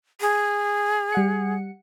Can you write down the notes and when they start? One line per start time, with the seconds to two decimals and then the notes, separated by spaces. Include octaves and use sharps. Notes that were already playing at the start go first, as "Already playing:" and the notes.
0.21 G#4
1.12 G3 F#5 C#7